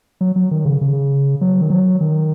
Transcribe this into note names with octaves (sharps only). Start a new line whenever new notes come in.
F#3
F#3
D#3
C#3
C#3
F#3
D#3
F#3
D#3